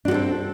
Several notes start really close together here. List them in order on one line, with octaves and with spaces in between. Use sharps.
D4 F#4 A4 C4